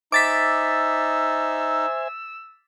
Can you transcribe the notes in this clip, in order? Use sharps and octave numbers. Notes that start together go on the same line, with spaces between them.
D#4 C5 E5 G#5 D6 E6 A6 B6